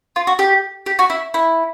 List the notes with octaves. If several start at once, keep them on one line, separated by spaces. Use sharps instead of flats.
F4
F#4
G4
G4
F#4
E4
E4